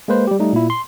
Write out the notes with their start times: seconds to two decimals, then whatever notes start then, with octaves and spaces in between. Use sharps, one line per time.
0.08 G#3 A#3 B4 C5
0.27 G3 G4
0.39 G3 A3 D#4
0.53 A#2 E4
0.70 C6